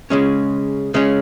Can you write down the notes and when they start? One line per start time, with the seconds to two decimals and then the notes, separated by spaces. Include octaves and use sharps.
0.10 C#3 G#3 C#4
0.94 C#3 G#3 C#4